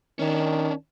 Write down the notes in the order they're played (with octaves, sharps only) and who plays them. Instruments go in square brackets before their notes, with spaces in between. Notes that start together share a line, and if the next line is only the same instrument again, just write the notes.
[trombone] D#3 [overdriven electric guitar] C#4 D4